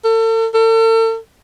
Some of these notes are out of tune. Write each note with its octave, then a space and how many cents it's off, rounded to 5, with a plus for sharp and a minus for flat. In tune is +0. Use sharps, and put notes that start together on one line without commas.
A4 +40
A4 +40